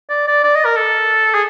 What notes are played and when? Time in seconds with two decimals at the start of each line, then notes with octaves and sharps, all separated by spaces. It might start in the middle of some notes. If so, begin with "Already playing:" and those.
0.10 D5
0.28 D5
0.44 D5
0.55 D#5
0.65 A#4
0.76 A4
1.34 G#4